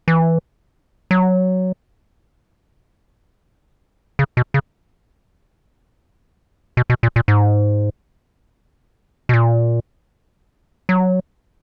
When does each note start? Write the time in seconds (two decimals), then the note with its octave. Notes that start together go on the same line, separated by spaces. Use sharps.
0.08 E3
1.11 F#3
4.19 C#3
4.37 B2
4.54 C#3
6.77 B2
6.90 B2
7.03 A#2
7.16 A#2
7.28 G#2
9.29 B2
9.33 A#2
10.89 F#3